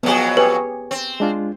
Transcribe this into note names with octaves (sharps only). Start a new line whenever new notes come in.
F2 F#3 B3 G#4
G4 G#4 B4 C#5
C4
G#3 D4 F4